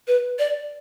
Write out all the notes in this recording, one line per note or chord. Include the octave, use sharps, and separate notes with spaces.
B4
D5